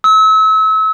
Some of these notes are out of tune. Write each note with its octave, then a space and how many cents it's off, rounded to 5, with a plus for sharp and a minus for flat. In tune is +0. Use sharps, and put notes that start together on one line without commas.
E6 -35